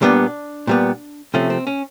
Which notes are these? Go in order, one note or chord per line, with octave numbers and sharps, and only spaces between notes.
A#2 G3 B3 D4
A#2 G3 B3
C3 F3 A3 C#4
C4
C#4